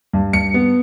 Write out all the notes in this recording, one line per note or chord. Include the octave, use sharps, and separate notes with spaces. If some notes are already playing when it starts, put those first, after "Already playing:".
G2
G2 C#7
B3